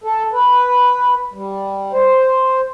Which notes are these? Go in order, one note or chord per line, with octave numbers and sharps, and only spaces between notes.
A4
B4
G3
C5